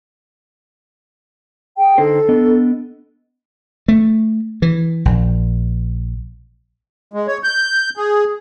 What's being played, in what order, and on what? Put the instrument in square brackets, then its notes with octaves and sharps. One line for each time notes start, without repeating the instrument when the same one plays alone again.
[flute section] G#4 G5
[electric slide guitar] D3 D#4 C5 [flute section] A4
[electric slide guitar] B3 D4 D#5
[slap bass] A3
E3
A#1
[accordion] G#3
C#5
G6
G#4